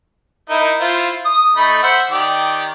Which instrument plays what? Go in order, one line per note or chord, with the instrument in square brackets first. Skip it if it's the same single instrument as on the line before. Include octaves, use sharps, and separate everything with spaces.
[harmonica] D#4 E4 A#4
E4 F4 C5
D#6
A3 D#4 B5
C5 E5 F#5
D#3 G4 D5